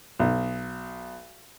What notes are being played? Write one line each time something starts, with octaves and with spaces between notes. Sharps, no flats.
B1